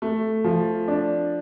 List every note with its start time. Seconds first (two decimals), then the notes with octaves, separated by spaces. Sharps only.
0.02 A3
0.44 F3
0.88 D4